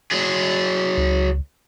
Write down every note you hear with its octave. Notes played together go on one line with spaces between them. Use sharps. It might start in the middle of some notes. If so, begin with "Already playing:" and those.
F#3 G#4
C#2